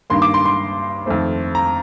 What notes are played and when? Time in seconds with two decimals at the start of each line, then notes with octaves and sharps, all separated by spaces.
0.10 G2 D#3 A#3 C6
0.22 D6
0.34 C6
0.46 C6
1.06 F2 D#3 A3 C4
1.55 A#5